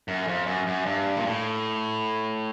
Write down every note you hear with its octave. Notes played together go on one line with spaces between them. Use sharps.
F#2
F2
F#2
F#2
G2
A#2
A2